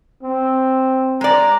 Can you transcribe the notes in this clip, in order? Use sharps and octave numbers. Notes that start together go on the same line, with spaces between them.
C4
G#3 D5 A#5